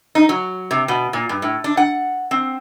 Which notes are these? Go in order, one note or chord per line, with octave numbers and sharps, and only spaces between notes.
D#4
F#3
C3
B2
A#2
G2
A2
D4
F#5
C4